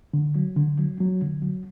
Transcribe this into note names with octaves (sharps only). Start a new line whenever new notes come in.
D3
F#3
D3
F#3
F#3
D3
F#3